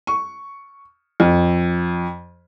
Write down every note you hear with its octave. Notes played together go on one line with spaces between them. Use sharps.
C#6
F2